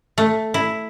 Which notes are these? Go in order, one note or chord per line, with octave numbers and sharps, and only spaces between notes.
A3
E4